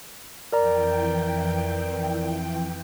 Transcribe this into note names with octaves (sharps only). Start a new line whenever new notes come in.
F2 E3 A#4 D5 G5 A#5